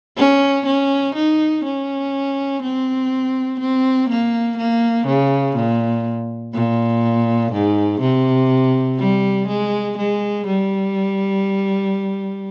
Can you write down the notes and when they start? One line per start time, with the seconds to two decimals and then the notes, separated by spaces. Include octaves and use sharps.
0.17 C#4
0.66 C#4
1.15 D#4
1.64 C#4
2.62 C4
3.60 C4
4.09 A#3
4.58 A#3
5.07 C#3
5.56 A#2
6.54 A#2
7.52 G#2
8.01 C3
8.99 G3
9.48 G#3
9.97 G#3
10.47 G3